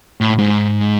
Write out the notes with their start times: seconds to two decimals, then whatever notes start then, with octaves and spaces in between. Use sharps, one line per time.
0.21 A2
0.39 G#2